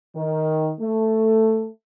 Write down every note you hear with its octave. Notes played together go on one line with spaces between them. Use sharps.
D#3
A3